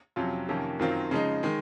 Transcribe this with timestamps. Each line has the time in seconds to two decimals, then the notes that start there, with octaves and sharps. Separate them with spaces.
0.16 F2 C3 F#3 C#4 F4
0.49 F2 C3 D#3 A#3 C#4
0.79 F#2 D#3 F#3 C4 F4
1.11 C#3 F3 G#3 D#4
1.43 D#3 G#3